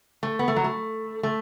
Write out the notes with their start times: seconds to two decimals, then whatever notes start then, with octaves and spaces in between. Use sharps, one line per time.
0.23 A3
0.39 B3
0.48 A3
0.56 F#3
0.64 A3
1.23 A3